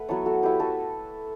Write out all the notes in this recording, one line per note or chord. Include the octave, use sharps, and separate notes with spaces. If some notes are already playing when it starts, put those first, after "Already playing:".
Already playing: A3 B4 F#5
F#3 B3 E4 A4 C#5
F#4 A4
A3 E4 G4 B4
F#4 A4